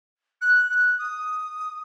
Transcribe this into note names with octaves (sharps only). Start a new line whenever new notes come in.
F#6
F#6
D#6